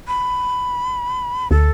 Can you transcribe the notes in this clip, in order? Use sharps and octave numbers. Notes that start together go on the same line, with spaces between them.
B5
D2 A4